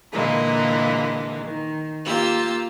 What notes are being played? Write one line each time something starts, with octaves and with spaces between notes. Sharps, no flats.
A#2 D3 E3 G#3 A#3
D#3
A#3 F4 G4 E6